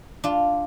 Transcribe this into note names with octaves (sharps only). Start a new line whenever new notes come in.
D4 F4